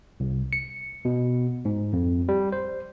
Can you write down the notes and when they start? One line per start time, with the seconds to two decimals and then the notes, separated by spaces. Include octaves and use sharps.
0.20 C2
0.53 C#7
1.05 B2
1.65 G#2
1.93 F2
2.29 G3
2.52 C5